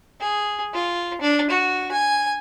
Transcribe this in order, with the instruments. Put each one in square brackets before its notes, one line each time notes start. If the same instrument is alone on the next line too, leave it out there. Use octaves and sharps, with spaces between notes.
[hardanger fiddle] G#4
F4
D4
F#4
G#5